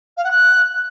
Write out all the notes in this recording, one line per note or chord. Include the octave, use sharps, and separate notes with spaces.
F5
F#5
F#6